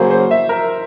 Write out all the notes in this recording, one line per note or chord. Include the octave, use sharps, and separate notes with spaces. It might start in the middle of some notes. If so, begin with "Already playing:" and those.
Already playing: C#3 F#3 A#3 C5
C5
E5
A#4